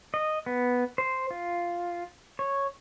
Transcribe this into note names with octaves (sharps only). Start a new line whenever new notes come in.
D#5
B3
C5
F4
C#5